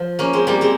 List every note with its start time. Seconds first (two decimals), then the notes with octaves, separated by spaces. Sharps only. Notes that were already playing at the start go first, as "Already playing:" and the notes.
Already playing: F3
0.19 A#3 C#4
0.33 G#3 C4
0.47 G3 A#3
0.61 G#3 C4